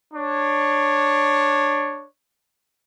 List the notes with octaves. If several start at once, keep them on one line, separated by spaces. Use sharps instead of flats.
D4 C#5